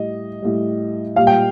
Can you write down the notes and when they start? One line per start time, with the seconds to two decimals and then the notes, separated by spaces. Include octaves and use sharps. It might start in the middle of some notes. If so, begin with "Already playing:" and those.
Already playing: A2 G3 D#5
0.42 A2 G3
1.16 A#2 G3 F5
1.27 G5